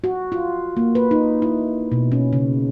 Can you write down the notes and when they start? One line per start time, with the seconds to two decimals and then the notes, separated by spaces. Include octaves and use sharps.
0.04 F#4
0.32 F4
0.77 A#3
0.95 B4
1.11 D#4
1.42 E4
1.92 B2
2.12 C#4
2.33 C#3